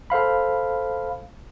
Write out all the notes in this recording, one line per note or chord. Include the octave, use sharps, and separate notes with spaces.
A4 C5 F5 B5